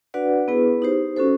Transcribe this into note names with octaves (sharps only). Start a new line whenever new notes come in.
D4 F#4 B4 D5 F#5
B3 E4 G#4 B4
D#4 G4 C5
C#4 F#4 A4 C5